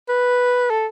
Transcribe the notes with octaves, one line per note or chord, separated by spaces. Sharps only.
B4
A4